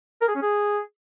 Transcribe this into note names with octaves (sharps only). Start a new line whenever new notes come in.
A#4
G#4
C#4
G#4